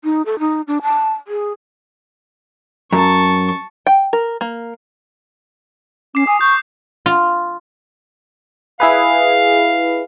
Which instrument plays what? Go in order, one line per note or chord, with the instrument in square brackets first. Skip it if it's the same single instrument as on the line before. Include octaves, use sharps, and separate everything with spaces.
[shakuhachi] D#4
A4
D#4
D4
A5
G#4
[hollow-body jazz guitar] F#2 [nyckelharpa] A5 C#6
[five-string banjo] G5
A#4
A#3
[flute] C#4 [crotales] D6 C7
[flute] G#5 [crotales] D#6
[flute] C#6 [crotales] G6
[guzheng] F4
[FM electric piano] E4 G#4 B4 [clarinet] F5